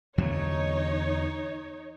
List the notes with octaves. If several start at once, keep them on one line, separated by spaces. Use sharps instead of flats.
E2 D3 F#3 D#4 C#5